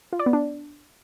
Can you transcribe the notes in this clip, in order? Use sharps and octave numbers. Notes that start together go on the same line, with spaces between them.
F4
D5
B3
D4